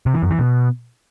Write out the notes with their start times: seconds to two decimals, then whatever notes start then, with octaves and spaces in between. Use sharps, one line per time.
0.06 C3
0.14 E3
0.22 F#2
0.31 E3
0.39 B2